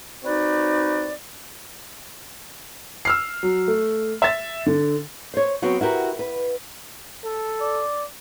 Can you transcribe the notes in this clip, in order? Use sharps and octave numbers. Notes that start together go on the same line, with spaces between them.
C4 D#4 F#4 B4 C#5 D5
E6 F6 C7
F#3
A3
E5 A6
D3
C5 C#5
F#3 B3 C4 F#4
E4 F#4 G4 A#4
B4
A4
D5